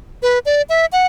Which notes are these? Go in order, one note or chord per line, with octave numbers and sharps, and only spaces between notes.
B4
D5
E5
F#5